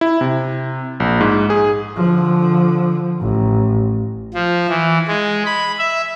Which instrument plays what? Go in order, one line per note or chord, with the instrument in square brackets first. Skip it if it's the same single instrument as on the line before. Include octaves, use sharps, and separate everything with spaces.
[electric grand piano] E4
C3
A#1
G#2
G#4
[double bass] D3 F3
A1
[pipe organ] F3
E3
G#3
B5
E5